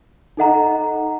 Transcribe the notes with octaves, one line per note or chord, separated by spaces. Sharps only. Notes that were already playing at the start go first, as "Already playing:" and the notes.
D#4 A4 D#5 F#5 A#5